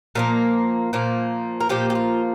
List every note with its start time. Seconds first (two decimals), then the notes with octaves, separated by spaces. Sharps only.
0.15 A#2 F3 A#3 A#4
0.93 A#2 F3 A#3
1.60 A#4
1.69 A#2 F3 A#3 G4
1.90 G4
1.95 F4